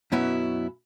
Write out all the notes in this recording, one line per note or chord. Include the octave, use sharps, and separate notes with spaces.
F#2 B2 B3 C#4 E4